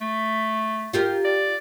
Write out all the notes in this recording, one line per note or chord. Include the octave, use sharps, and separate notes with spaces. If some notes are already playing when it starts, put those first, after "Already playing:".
A3
F4 G4 A#4
D5